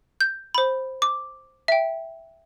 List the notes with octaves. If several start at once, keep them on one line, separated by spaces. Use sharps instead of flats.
G6
C5 B5
D6
E5 G5